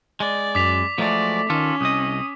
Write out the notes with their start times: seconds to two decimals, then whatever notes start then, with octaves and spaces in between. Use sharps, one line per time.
0.20 G#3 D5
0.55 F#2 D6 B6 F7
0.98 F3 F#3 G#3 A3 D5
1.50 D#3 C#4 F4 A4
1.81 C2 D#5 D#6